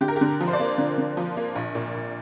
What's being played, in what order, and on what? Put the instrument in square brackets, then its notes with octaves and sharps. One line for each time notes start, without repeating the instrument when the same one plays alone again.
[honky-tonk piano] D3 G4
A#4
G4
D3
F3
C5
D5
A#3
D3
D3
F3
A#3
A#1
A#2
A#1